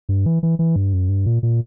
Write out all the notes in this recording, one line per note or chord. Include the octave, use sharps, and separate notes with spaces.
G2
E3
E3
E3
G2
F#2
G2
A#2
A#2